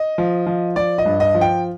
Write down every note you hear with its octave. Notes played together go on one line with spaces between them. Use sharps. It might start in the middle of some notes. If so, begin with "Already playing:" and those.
Already playing: D#5
F3
F3
F3 D5
D#5
G2
D#5
F3
G5